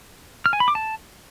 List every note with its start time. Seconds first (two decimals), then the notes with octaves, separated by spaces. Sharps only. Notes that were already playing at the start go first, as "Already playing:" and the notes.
0.46 F6
0.53 G#5
0.60 B5
0.68 D6
0.75 A5